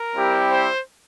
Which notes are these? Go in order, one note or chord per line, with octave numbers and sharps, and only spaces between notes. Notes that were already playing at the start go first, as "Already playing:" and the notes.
Already playing: A#4
G3 C4 E4 G4
C5